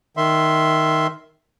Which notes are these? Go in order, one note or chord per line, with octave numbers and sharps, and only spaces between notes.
D#3 E5 C6